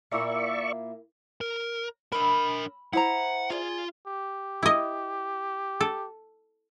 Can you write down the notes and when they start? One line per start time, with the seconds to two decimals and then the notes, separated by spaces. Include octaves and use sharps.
0.11 A#2 A#3 E4 D5 E5 C#6
1.41 A#4
2.12 D4 A#4 B5 E6
2.93 E4 C5 F#5 A#5
3.50 F4 G#4 D5
4.08 G4
4.63 E4 D#5
5.80 A4